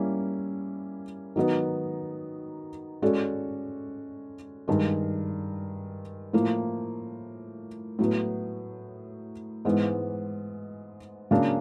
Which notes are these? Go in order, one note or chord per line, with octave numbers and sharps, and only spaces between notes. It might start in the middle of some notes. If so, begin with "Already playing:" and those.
Already playing: G3 A#3 C#4 E4
D#3 F#3 B3 D#4
G#3 C#4 F#4 A4 D5
G2 D#3 G#3
A2 F3 A#3
A2 F#3 B3
G#2 E3 G#3 B3
C#3 F#3 A#3 D4